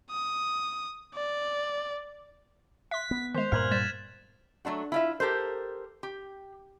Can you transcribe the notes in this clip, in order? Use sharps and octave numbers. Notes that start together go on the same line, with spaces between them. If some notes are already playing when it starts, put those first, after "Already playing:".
D#6
D5
E5 C6 F#6 B6
B3
D#3 G#3 C5 B6 F7
G2 A#2 A#4 E5 F6 G#6 F#7
G3 A6 B6 E7
F#3 A3 D4 F#4
E4 F4 E5
G4 A4 A#4 C5
G4